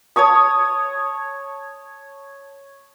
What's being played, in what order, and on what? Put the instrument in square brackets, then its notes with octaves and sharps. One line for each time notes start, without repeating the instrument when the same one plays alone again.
[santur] C#5 A5 C#6 D#6